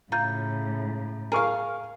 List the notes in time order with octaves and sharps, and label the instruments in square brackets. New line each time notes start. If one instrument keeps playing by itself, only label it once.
[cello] A2 C#3 [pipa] F4 [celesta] A#5 G6
[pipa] G#4 F5 [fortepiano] A#4 C#6